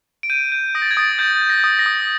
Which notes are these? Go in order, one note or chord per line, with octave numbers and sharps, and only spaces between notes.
D7
G6 D#7
G6
D#6 A#6
A6
G#6
D#6 A6
G6 A6
G6
A#6
D#6
A#6
D#6